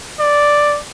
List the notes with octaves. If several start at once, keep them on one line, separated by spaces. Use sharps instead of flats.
D5